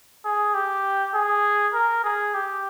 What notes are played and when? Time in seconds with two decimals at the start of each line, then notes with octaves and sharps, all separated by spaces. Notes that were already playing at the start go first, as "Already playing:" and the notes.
0.25 G#4
0.54 G4
1.14 G#4
1.74 A#4
2.04 G#4
2.34 G4